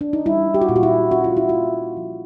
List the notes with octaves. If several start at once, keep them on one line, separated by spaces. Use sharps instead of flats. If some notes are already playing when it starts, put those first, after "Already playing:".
D4
D#4
G3 E4
G4
F#4
A#2 F4
F#4
E4
C#4 F#4
F4
E4
F4
A#3
F3